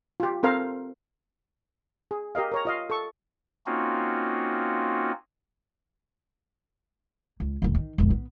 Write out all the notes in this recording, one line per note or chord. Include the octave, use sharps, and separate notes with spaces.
F4 G4
C4 A4 A#4 C5 F5
G#4
G4 A#4 D#5 F5
A#4 C#5 A#5
F4 D#5 F5
A4 C#6
A#3 C4 C#4 D#4 F4 F#4
C#2
D#1 D2
D#3
E1 A#1
B3